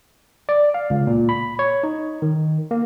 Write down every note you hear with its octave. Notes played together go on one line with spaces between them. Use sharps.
D5
F5
C#2
A#2
B5
C#5
D#4
D#3
A#3